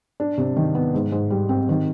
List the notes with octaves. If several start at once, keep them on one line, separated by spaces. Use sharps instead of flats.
D4
C3
D#3
B3
G#2
G#2
G3
C4
D#3